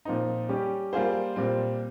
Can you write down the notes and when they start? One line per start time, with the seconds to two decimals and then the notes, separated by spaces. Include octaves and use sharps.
0.05 A#2 F3 C4 D#4
0.49 G3 C#4 G4
0.93 G3 A#3 F4 G#4 C5
1.36 A#2 G3 C4